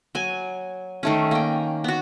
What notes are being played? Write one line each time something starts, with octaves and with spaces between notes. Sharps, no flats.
F#3 G#5
D#3 A3 C#4
A#3 G5
B3 F#4